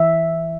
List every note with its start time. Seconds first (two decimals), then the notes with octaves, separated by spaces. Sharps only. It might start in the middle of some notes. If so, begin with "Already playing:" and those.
Already playing: E3 E5